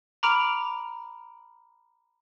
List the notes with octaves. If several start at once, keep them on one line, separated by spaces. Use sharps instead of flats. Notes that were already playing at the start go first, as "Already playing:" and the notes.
A#5 B5 D6 F6 D7 F7